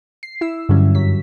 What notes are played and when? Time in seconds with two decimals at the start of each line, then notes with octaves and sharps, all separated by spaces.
0.23 C7
0.41 E4 E6
0.69 G2 D3 F#3 G3 C#4
0.95 F#2 F#3 B6